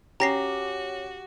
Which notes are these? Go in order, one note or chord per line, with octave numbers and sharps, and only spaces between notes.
C#4 F#4 G4 A#5 A#6 C7